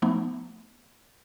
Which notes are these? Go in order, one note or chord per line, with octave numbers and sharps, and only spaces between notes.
F3 A3 B3 D#4